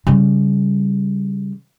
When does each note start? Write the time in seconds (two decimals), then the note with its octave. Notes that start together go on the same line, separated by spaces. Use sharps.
0.07 C#3 G3